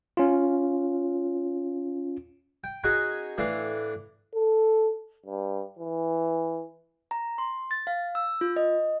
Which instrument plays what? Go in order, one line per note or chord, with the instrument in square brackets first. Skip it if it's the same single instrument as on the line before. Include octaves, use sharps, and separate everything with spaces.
[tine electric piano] C#4 F4
[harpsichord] G5
C#4 D#4 F#4 G#4 F#5 G#5
A2 E3 D4 F5
[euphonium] A4
G2
E3
[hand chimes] A#5
C6
A6
F5
E6
F4
D#5